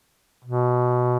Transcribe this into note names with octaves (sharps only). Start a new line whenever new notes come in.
B2